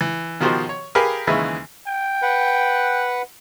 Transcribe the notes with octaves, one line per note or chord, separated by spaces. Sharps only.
E3
B2 D#3 F3 F#4 G4 C5
C#5
G4 G#4 A#4 B4 F5 G#5
D#2 C#3 E3 G#3 B4 E5
G5
B4 F#5